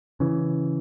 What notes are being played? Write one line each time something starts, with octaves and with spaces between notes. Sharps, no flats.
C#3 E3